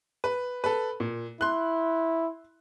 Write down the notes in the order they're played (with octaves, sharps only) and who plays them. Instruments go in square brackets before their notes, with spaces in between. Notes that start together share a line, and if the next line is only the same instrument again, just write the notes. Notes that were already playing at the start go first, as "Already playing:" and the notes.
[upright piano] B4
A4 B4
A#2
[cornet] E4 [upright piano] C6 F#6